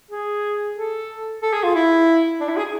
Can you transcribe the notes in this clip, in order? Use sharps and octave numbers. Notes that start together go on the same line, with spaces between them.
G#4
A4
A4
G#4
F4
E4
D4
E4
G#4